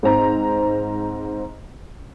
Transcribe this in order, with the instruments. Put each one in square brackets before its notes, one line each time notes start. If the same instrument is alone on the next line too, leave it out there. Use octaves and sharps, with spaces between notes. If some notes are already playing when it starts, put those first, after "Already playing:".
[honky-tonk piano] G#2 C4 A#5